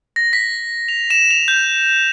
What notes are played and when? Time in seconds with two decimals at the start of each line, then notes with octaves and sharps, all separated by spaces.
0.16 A#6
0.33 B6
0.88 F7
1.10 E7
1.31 F7
1.48 G6